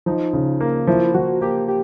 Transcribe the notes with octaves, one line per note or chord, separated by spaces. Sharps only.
F3 D#4
C#3
A#3
F3 E4
F3 F#4
A#3 G4
G4